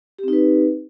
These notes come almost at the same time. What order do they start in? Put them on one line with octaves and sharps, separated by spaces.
G4 C4 D#4 B4